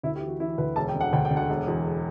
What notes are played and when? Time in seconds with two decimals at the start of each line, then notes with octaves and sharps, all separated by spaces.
0.03 D2 E4
0.16 G4
0.22 E3
0.28 F#4
0.40 E3 E4
0.58 D2 B4
0.76 E1 A5
0.88 G5
0.95 D3
1.01 F#5
1.13 D2 G5
1.25 G5
1.31 D3
1.37 F#5
1.49 E1
1.68 E2